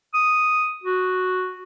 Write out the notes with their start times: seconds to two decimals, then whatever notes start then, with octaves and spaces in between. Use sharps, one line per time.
0.14 D#6
0.84 F#4